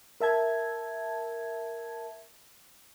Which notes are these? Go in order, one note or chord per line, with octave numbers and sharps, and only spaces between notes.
A#4 E5 A5 G#6